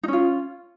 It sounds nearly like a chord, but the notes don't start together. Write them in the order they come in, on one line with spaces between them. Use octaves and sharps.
D#4 C#4 F4